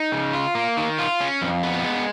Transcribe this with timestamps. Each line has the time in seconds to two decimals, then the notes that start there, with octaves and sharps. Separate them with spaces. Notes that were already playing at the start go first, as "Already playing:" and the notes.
Already playing: D#4
0.12 C#3
0.33 F4
0.55 A#3
0.77 D#3
0.98 F4
1.20 C#4
1.41 F2
1.63 B3
1.84 G#3